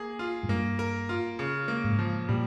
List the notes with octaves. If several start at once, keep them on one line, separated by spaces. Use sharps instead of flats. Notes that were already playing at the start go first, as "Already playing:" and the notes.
Already playing: A#3 G#4
F4
G#2
G2 A#3
A#4
F4
C#3
A#3
G#2
F3
A#2 G3